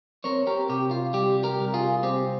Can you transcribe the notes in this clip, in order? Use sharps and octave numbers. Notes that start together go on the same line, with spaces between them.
C4 A#4 C#5
G4 A#4
C3 G4
F4
G3 G4
G4 A#4
C2
F4 G#4
C4 G4